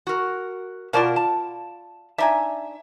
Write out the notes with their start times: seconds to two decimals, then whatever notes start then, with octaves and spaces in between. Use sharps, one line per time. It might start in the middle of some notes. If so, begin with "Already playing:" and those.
0.07 F#4 A#4
0.93 B2 F4 A#4 D5 F5 A5
1.16 A5
2.18 D4 D#4 E5 G#5